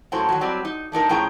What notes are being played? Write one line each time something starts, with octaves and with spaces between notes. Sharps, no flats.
A2 F#3 A#3 C#4 A4 C5
D#3 F#3
F#3 G3 C4 G4 D5
D#4
A3 D4 D#4 A#4
A2 F3 C#4 G#4 G5 A#5